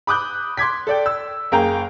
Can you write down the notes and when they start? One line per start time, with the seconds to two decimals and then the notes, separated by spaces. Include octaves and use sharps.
0.07 B5 D6 D#6 F#6 G6
0.57 C6 D6 G#6 B6
0.87 A4 D5 G5
1.06 E6
1.52 F#1 A#3 G#4 A#4 G5 A#5